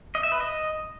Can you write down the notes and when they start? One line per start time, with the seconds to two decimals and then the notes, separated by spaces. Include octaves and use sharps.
0.15 D#5
0.23 E5
0.32 B4
0.40 D#5